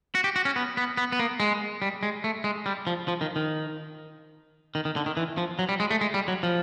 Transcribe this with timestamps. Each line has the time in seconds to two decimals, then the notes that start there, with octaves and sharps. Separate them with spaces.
0.15 F#4
0.24 G4
0.36 F#4
0.45 C#4
0.56 B3
0.77 B3
0.97 B3
1.12 B3
1.20 A#3
1.40 G#3
1.82 G3
2.03 G#3
2.24 A3
2.44 G#3
2.66 G3
2.87 F3
3.08 F3
3.21 D#3
3.36 D#3
4.75 D#3
4.85 D#3
4.96 D3
5.06 D#3
5.17 E3
5.38 F3
5.59 F#3
5.69 G3
5.80 G#3
5.91 A3
6.01 G#3
6.14 G3
6.28 F#3
6.43 F3